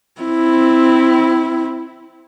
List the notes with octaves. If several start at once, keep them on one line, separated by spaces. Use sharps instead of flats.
C4 E4